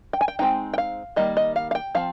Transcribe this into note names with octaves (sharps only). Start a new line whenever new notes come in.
G5
G#5
G5
G#3 C4 D#4 G5
G5
F5
D#3 G3 A#3 D#5
D#5
F5
F5
G5
F3 C4 F5